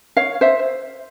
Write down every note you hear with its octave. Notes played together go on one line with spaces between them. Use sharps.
C#5 F5
C5 E5